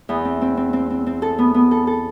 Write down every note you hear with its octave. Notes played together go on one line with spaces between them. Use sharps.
E2
C4
C4
C4
C4
C4
C4
A4
B3
B3
A4
A4